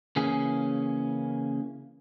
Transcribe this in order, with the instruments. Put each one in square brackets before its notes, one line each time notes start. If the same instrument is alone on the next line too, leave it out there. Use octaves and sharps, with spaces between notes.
[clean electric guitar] C#3 E3 A#3 C#4 G#4